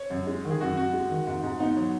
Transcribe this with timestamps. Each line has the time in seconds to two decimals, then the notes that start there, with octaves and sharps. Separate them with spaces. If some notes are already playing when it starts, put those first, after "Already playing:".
Already playing: C#5
0.10 F#2
0.27 G#3
0.44 D#3
0.51 G#4
0.61 F#2 F#4
0.77 F#2 F#4
0.93 G#3
1.09 D#3
1.27 G#2
1.44 G#2
1.59 B3 D#4
1.76 F#3